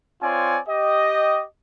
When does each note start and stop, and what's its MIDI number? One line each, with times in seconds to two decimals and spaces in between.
0.22 0.59 60
0.22 0.59 65
0.22 0.59 73
0.22 0.59 74
0.22 0.59 80
0.68 1.44 67
0.68 1.44 75